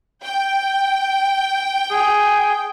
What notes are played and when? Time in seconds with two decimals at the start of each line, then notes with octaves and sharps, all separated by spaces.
0.23 G5
1.91 G#4